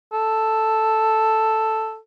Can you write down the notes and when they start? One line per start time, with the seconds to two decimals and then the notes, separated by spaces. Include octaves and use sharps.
0.13 A4